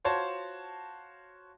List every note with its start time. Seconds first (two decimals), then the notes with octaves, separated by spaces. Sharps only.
0.04 F4 F#4 C5 C#5 A5